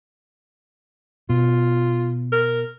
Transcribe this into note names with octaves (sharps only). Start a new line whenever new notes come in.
B2 F4
A#4